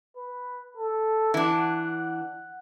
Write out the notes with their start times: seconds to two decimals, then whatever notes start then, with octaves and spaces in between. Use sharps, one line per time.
0.16 B4
0.77 A4
1.34 E3 D4 F#5